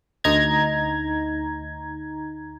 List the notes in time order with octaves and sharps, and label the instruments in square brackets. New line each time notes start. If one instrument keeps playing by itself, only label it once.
[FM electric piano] D2 D#4 A#5 G#6